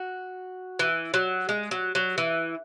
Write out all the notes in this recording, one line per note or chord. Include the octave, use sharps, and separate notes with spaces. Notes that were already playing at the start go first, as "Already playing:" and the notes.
Already playing: F#4
E3
F#3
G#3
F#3
F#3
E3